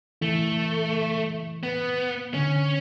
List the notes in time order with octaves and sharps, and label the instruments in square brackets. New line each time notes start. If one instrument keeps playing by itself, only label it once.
[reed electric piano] E3 [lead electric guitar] A3
[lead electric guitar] B3
[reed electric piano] D3 [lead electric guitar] C#4